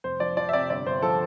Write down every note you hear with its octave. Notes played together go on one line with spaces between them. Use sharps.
F1 C5
F3 D5
F3 D5
E5
C3 D5
G1 D5
G1 C5
F3 A4